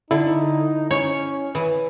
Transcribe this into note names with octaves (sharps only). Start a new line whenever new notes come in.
D3 D#4 E4
C#4 C#5
E3